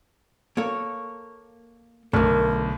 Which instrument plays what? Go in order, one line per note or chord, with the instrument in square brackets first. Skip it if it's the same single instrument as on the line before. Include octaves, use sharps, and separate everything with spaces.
[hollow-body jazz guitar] A#3 A4 C#5
[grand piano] B1 [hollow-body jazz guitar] D3 A3 [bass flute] A#4